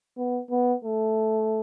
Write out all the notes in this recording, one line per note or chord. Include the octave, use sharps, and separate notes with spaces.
B3
B3
A3